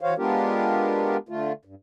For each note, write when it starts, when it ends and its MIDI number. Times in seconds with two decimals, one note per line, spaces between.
0.01 0.14 52
0.01 0.14 66
0.01 0.14 72
0.01 0.14 73
0.01 0.14 77
0.17 1.17 56
0.17 1.17 59
0.17 1.17 62
0.17 1.17 65
0.17 1.17 67
0.17 1.17 70
1.29 1.52 50
1.29 1.52 57
1.29 1.52 65
1.65 1.75 43